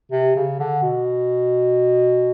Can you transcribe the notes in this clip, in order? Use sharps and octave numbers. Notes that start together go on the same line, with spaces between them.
C3
C#3
D3
B2